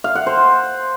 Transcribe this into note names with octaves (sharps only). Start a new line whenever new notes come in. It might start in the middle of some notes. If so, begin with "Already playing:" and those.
F5
F#5
C5